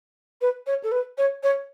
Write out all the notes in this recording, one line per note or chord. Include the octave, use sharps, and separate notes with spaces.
B4
C#5
A4
B4
C#5
C#5